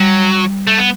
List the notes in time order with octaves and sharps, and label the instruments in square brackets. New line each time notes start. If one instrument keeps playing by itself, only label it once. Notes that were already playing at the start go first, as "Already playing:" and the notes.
Already playing: [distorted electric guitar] F#3 [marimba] G3
[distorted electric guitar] A3
B3